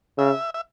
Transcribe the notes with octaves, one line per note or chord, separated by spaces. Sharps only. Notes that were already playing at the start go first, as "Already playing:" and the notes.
C#3 E5
E5